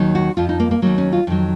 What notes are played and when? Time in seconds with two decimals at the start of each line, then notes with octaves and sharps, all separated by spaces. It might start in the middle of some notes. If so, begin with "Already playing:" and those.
Already playing: D#2 D#3 F#3
0.15 F#4
0.37 F2 F3 F4
0.49 D#4
0.60 A#3
0.71 A#3
0.82 D#2 D#3 F#3 A#3
0.98 C#4
1.12 F4
1.27 F2 D#3 F#3